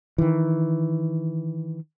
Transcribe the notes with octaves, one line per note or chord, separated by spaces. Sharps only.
D#3 E3